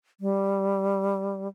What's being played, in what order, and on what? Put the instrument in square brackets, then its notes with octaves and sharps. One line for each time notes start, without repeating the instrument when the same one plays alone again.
[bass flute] G3